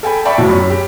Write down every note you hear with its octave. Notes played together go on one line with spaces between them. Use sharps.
A4 G5 G#5 B5
D5 E5 G5 A5 B5 C#6
F2 A2 F#3 E4
F#2 B5
G4